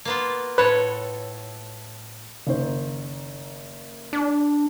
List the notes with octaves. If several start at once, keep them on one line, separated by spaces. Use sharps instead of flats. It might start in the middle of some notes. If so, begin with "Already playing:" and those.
A#3 B3 F4
A2 A4 B4 C#5
F#1 D#3 C5
D4